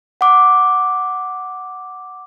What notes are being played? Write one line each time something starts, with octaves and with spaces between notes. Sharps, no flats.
F#5 D6